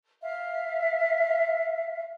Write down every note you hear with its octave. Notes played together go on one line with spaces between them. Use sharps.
E5 F5